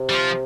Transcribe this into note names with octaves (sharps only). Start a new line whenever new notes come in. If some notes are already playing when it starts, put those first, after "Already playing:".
Already playing: C3
G3
F3